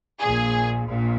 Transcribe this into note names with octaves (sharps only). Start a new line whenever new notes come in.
A#1 A#2 G#4
A#1 A#2